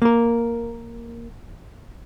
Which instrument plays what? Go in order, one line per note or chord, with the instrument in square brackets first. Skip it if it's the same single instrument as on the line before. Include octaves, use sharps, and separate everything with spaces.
[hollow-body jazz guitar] A#3 A#4